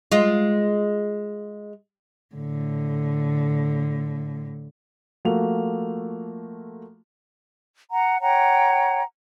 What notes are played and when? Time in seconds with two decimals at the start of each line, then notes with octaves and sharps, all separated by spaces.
0.12 G#3 F4
2.35 A2 D3
5.25 F3 A3 A#3 F4 F#4 F7
7.91 F#5 A#5
8.21 C#5 F#5 G5 A#5